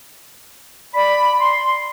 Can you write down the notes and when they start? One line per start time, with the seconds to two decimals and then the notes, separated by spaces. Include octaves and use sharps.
0.94 D5 B5
1.40 C6